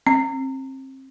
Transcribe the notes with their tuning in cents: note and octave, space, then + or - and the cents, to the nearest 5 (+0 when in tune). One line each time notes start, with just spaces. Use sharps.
C4 +30